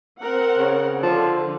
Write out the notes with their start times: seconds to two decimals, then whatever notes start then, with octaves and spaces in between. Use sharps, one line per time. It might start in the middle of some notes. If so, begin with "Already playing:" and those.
0.20 C4 A#4 F#5
0.58 C#3
1.03 D3 F3